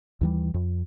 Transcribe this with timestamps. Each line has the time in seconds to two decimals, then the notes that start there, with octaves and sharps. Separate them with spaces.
0.21 D#2 E3 G3
0.54 F2